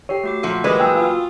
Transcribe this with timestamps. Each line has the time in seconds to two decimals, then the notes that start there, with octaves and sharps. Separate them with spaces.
0.09 G4 A4 C#5 C7
0.24 A3 F#4 D6
0.43 A#2 F3 F#4 A4 E5 F#5
0.64 A#2 D3 E3 F#3 G#3 G4 B4 D5
0.80 A#3 F#4 G5 G#5 D#6 E6
0.96 F4